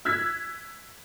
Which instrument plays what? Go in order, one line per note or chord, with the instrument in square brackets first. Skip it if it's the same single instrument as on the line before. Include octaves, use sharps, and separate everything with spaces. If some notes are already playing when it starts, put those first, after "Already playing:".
[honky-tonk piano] E6 F#6 G#6 B6